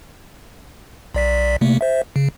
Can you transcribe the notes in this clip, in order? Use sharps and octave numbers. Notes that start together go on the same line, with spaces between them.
B1 D5 B6
C3 A3 A#3
C5 E5
C#3